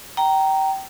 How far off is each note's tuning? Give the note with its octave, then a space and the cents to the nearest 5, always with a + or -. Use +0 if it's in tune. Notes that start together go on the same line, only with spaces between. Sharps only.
G5 -20 A#5 +0